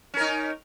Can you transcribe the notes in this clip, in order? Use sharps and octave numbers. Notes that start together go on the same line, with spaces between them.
C#4 D#4 A#4